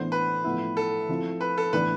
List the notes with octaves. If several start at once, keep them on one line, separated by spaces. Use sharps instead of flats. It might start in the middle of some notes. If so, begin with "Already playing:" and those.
Already playing: A2 E3 B3 D4 C5
B4
A2 F3 B3 E4
A4
F3 C4 E4
B4
A4
A2 E3 B3 D4 B4